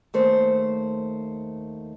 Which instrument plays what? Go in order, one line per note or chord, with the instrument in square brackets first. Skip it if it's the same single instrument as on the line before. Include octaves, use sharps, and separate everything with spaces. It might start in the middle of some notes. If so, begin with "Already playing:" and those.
[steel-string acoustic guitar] D#2 A3 C5